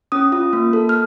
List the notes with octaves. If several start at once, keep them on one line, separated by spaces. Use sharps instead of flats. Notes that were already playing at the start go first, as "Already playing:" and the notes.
C#4 D#6
F4
A#3
A4
F6